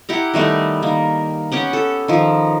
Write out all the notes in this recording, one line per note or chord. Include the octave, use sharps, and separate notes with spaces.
E4 G4 F#5 A#5
D#3 G3 A3 B3
D#3 A#3
B3 C#4 G4 F#5
A4
D#3 F3